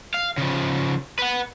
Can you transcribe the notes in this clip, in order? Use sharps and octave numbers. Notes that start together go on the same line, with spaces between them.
F5
C#3 F3
B4 F#5